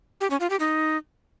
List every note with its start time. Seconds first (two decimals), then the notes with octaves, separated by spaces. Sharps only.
0.21 G4
0.30 C#4
0.40 F4
0.50 G4
0.60 D#4